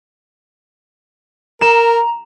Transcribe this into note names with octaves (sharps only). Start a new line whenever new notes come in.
A#4 A#5 E7